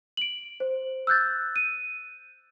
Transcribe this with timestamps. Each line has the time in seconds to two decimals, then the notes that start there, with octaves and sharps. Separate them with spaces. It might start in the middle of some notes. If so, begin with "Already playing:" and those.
0.17 D7 F#7
0.60 C5
1.07 E6 F#6 G6 A6
1.56 D#7